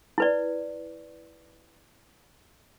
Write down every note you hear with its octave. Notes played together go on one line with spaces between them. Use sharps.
E4 B4 D5